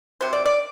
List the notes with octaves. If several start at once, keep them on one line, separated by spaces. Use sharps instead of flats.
C3 F#3 C5
D5
D5